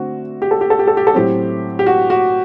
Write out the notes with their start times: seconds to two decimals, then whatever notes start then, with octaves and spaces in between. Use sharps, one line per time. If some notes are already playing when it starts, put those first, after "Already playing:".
Already playing: D3 A3 C4 F#4
0.42 G4
0.51 A4
0.61 G4
0.70 A4
0.79 G4
0.87 A4
0.97 G4
1.07 A4
1.14 A2 F#3 C4 G4
1.79 G4
1.86 F#4
2.10 F#4